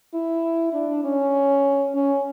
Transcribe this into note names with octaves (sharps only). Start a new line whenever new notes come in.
E4
D4
C#4
C#4